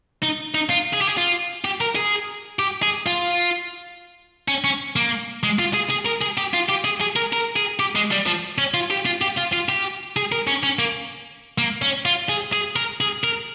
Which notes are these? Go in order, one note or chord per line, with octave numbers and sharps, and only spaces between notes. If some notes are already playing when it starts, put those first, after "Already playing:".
D#4
D#4
F4
G#4
G4
G#4
F4
G4
A#4
G#4
G4
G#4
F4
C#4
C#4
A#3
G#3
F4
G#4
G#4
A#4
G#4
G4
F4
G4
G#4
G#4
A#4
A#4
G#4
G4
G#3
G3
F3
C#4
F4
G4
F4
G4
F4
F4
G4
G#4
A#4
C#4
C#4
A#3
A#3
C#4
F4
G#4
G#4
A#4
G#4
A#4